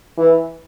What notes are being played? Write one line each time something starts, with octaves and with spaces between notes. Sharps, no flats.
E3